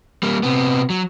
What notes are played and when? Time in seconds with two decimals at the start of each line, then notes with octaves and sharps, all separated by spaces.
0.23 G3 A#3
0.43 C3 B3
0.90 F#3